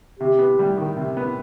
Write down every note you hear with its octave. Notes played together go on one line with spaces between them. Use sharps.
C3 G4
B3
G3
D#3
C3
B3